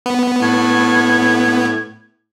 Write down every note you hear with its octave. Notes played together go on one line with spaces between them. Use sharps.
B3
A2 G#6